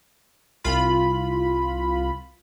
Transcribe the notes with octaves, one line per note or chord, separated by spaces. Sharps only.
C2 F4 B5